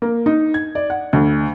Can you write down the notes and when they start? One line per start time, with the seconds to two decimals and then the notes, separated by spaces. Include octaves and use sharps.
0.02 A#3
0.26 D#4
0.54 G#6
0.75 D5
0.90 F#5
1.13 D2